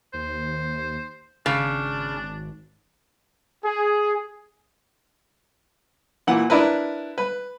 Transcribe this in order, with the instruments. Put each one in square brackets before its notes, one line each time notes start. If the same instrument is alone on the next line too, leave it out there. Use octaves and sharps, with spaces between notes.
[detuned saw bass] D#2 [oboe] C5
[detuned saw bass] G#1 [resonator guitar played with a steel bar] C#3 [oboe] D4
[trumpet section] G#4
[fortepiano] A#2 E3 F#5
D4 E4 A#4 B4
B4